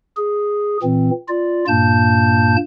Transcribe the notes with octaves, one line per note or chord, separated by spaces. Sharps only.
G#4
A#2 E3 C4
F4 D5
G2 A#2 A#3 A5 G6